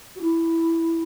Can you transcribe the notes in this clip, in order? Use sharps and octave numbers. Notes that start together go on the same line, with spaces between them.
F#4
E4